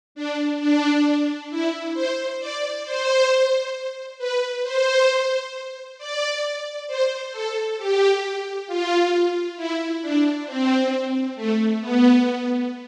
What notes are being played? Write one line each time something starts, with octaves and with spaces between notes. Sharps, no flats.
D4
D4
E4
C5
D5
C5
B4
C5
D5
C5
A4
G4
F4
E4
D4
C4
A3
B3